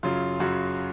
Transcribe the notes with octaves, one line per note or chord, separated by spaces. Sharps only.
F#2 C#3 F#3 F4
F#2 C#3 F#3 F#4